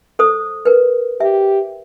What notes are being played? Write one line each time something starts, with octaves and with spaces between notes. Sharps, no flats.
A4 C5 D#6
A#4 B4
G4 E5